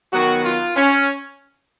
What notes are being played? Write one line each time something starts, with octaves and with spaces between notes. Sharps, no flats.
D#3 F#3 B3 F#4
F4
C#4